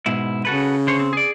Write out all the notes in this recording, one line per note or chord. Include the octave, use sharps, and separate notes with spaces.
G#2 B2 E4
C#3 F#4 A4 B4
D3 C5 C#5
C4
G#4 D5